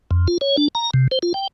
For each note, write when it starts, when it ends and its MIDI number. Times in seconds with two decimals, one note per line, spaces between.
0.11 0.27 41
0.28 0.38 65
0.41 0.56 73
0.57 0.68 62
0.75 0.91 82
0.94 1.08 48
1.11 1.19 72
1.23 1.33 65
1.34 1.47 79